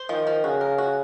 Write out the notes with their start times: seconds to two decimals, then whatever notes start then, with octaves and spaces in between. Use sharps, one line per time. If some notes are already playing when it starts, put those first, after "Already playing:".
Already playing: C5
0.09 D#3 F3
0.27 F3
0.44 C#3 F#4
0.61 A#4
0.78 F#4